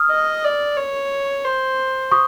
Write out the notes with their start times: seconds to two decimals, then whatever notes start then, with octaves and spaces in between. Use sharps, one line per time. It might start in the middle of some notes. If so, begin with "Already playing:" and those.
Already playing: D#6 F6
0.11 D#5
0.44 D5
0.77 C#5
1.45 C5
2.11 C#6 D#6